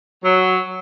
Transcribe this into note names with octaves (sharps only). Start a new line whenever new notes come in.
F#3